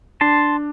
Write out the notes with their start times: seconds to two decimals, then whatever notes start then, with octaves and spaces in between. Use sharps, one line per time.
0.21 D4 A5 C6